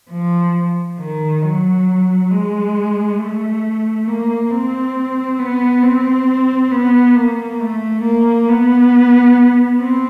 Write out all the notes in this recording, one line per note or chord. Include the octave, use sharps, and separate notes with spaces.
F3
D#3
F#3
G#3
A3
A#3
C4
B3
C4
B3
A#3
A3
A#3
B3
C4